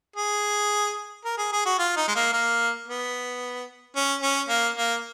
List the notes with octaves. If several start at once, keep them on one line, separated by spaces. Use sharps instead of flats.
G#4
A#4
G#4
G#4
F#4
F4
D#4
G#3
A#3
A#3
B3
C#4
C#4
A#3
A#3